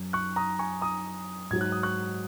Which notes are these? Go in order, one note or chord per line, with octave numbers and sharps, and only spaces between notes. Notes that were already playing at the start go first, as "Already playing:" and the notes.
Already playing: F#2
C#6 F#6
A#5 D#6
G#5 C#6
A#5 D#6
G#2 F#3 G#6
F#6
D#6
C#6 F#6